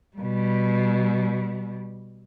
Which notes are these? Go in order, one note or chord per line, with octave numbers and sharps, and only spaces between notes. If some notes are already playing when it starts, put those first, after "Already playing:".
B2 G3